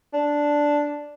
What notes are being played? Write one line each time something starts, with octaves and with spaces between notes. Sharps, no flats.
D4